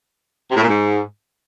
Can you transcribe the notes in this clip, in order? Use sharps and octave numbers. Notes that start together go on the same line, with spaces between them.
C3
A2
A#2
G#2